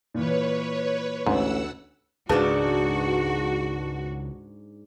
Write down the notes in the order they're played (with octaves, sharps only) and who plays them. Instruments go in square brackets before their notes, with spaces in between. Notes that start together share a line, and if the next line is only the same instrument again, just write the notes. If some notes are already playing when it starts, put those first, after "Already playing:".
[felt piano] A#2 E3 [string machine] B4 C#5
[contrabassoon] A1 [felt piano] D2 [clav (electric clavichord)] G#2 [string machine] F#5 E6
[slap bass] C#2 D#3 [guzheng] G#2 D4 [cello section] F#4 [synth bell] G#4 B4 A5